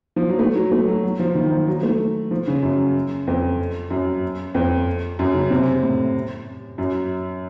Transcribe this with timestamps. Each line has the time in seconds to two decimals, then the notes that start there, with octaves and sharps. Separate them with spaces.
0.16 F3
0.29 F#3
0.39 A3
0.56 F#3
0.71 A3
0.87 F#3
1.03 F#3
1.19 F3
1.35 D#3
1.51 F3
1.67 F#3
1.83 A3
2.31 F3
2.47 C#3
2.62 F#2
3.27 F2
3.90 F#2
4.55 F2
5.19 F#2
5.34 C#3
5.50 C3
5.82 A2
6.78 F#2